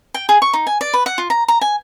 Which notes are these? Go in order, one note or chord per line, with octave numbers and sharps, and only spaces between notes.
G5
G#4
C#6
D#4
G#5
D5
B4
F#5
F4
A#5
A#5
G#5